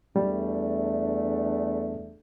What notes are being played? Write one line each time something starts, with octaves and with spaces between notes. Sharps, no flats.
E2 G3 A3 D4